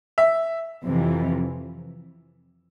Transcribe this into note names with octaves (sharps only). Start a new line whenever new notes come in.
E5
F2 C3 E3